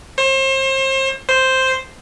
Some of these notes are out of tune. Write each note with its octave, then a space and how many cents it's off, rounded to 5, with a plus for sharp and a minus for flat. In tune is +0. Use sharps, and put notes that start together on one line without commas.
C5 +35
C5 +0